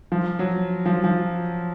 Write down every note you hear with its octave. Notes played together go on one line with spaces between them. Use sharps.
F3
F#3
F3
F3